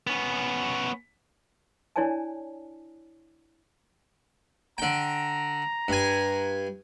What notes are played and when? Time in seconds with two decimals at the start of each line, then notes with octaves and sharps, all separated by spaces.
0.07 B3 C#4
1.96 D4 E4 C#5 D5 G#5 A5
4.78 D3 G5 A#5
5.88 G2 G#5